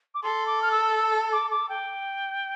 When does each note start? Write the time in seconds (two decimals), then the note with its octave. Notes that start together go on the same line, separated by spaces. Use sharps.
0.14 D6
0.23 A4 C6
0.47 D6
0.62 F6
0.71 E6
0.96 E6
1.32 D6
1.51 D6
1.69 G5